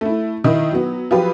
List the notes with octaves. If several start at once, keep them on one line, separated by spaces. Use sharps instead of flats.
A3 E4
D#3 D#4 E4
F#3 B3
F3 F#3 F4 G4 B4